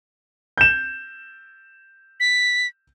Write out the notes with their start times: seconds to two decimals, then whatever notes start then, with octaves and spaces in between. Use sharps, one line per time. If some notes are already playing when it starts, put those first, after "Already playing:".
0.58 G6 E7
2.20 B6